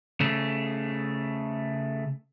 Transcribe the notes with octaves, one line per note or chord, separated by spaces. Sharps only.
C#3 A3